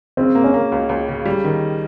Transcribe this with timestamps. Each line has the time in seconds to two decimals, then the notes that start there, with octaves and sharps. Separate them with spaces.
0.17 C#3 C4
0.35 A#3
0.44 C#4
0.54 A#3
0.72 C#2
0.89 C#2
1.09 C#3
1.25 G3
1.44 D#3